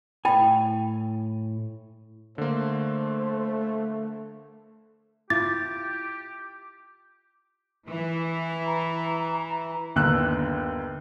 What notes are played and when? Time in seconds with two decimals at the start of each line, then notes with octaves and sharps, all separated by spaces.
0.25 A2 E4 G5 G#5 B5
2.38 D3 A3 A#3 C5
5.30 E4 F4 G4 D6 A6
7.88 E3
8.66 A#5
9.96 G1 D#2 D3 E6 F#6